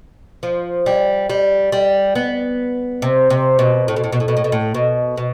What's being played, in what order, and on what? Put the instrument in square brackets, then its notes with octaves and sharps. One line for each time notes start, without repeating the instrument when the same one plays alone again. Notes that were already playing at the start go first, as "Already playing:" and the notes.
[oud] F3
G3
G3
G3
B3
C3
C3
B2
A2
B2
A2
B2
A2
B2
A2
B2
A2
B2
B2